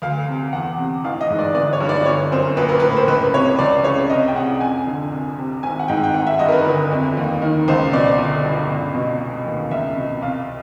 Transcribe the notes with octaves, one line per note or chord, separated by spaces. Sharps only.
D2 F5
C3
E2 F#5
C3
A1 F5
D#5
G#2
D5
G1 D5
C#5
G2
D5
G1 C#5
F#2 C5
A#1 B4
A#4
A2 B4
C5
C#2 B4
C3 C#5
C#2 D5
C#3 C#5
C2 D#5
G5
C3 F#5
F2 G#5
D3
C2
C3
G#1 G#5
F#5
G#2 G5
G5
G#1 F#5
E5
G2 D#5
A#4
B4
G1
F2
D#2
D#3
C#2 C5
B2 D5
G1
G2
C#2
B2
F1
D#2
C#2 E5
B2
C2 F5